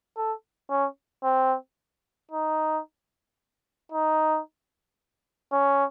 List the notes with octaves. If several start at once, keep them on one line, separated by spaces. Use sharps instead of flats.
A4
C#4
C4
D#4
D#4
C#4